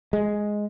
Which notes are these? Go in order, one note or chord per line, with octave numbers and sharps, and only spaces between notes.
G#3